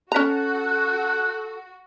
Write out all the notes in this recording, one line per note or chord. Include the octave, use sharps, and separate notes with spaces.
C#4 F#4 A4 A#5 F#6